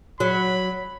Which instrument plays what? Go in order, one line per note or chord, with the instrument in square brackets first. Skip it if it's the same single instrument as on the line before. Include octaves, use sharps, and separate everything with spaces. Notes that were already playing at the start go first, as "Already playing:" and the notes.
[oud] F#3 [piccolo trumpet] B5